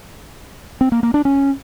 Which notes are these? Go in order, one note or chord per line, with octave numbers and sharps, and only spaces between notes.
C4
A#3
A#3
D4
C#4